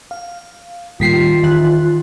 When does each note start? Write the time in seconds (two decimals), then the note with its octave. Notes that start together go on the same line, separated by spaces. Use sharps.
0.11 F5
1.00 D#2 A2 G3 F4 G5 B6 C7
1.43 E2 D#3 E5 F#6